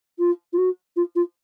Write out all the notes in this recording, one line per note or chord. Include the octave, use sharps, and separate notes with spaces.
F4
F4
F#4
F4
F4